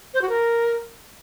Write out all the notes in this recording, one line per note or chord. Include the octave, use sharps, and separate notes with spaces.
C5
F#4
A#4